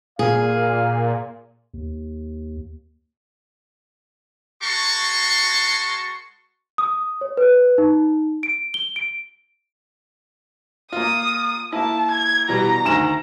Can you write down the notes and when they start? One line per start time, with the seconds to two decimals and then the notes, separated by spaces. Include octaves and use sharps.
0.19 A#2 G#4 F5
1.74 D#2
4.62 G#3 F#4 A#4 A5 C6 C#6
6.78 D#6
7.21 C#5
7.37 B4
7.78 D#4
8.43 D7
8.74 G7
8.96 D7
10.92 A#3 F4 D#6
11.72 A#3 E4 A5
12.11 G#6
12.49 B2 E3 G3 A#5
12.85 D2 D#3 E7